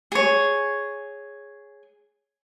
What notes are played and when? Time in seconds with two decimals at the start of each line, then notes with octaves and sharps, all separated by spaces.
0.12 G#4 C#5